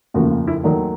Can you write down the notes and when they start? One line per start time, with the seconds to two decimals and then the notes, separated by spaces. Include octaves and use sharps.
0.14 F1 D#2 C#3 F3 A#3 F#4
0.31 F4
0.47 E4
0.64 D#2 D#3 F#3 A3 D4